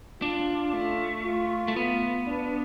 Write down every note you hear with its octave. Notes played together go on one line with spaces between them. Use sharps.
D4 F4
A3
F4
A3
B3 F4
D4